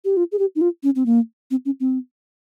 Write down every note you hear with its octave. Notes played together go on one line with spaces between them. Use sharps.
G4
F4
G#4
G4
D#4
F4
C#4
C4
A#3
C4
C#4
C4